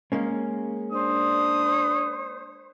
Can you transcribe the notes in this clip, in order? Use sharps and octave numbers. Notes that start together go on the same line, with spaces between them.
G#3 A#3 C#4
D4 C5 D#6